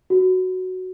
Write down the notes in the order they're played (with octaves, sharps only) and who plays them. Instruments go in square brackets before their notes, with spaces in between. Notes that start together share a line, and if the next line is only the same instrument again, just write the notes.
[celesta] F#4